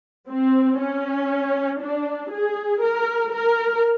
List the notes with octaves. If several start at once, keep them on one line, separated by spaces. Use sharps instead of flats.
C4
C#4
D4
G#4
A#4
A#4